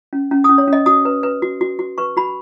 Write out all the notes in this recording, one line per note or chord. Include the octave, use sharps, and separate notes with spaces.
C#4
C#4
C#4 D#6
C#5
C#4
D#5
F#4 D#6
B4
B4
F#4
F#4
F#4
B4 C#6
F#4 B5